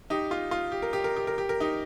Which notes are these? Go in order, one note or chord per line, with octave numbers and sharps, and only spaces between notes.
D#4 G4
F4
F4
G4
A#4
G4
A#4
G4
A#4
G4
A#4
D#4 G4